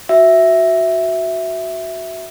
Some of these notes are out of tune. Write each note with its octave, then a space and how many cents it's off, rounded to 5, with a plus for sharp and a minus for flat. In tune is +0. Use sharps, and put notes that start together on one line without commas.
F#4 +0 E5 +0